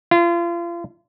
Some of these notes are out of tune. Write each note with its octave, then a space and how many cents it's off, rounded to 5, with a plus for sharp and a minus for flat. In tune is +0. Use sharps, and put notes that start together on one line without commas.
F4 -35